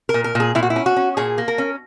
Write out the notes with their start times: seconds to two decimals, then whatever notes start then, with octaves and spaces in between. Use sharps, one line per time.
0.09 A#4
0.14 A#2
0.24 A#4
0.35 A#2 G#4
0.55 A#2 E4
0.63 F#4
0.70 E4
0.76 C#4
0.86 F#4
0.96 C#4
1.17 A#2 G#4
1.38 A#3
1.48 A#4
1.58 C#4